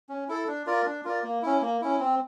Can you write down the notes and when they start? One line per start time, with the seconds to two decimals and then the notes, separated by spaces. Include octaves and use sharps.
0.09 C#4
0.29 E4 A4
0.48 D4
0.67 F4 A#4 D5
0.86 D4
1.05 F4 A#4 D5
1.24 A#3
1.42 C#4 E4
1.62 A#3
1.81 C#4 E4
2.00 C4